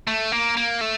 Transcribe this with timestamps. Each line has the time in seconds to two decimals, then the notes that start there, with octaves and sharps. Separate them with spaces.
0.07 A3
0.32 A#3
0.57 A#3
0.81 A3